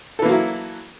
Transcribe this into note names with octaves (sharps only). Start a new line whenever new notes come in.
E3 F#3 A#3 E4 A4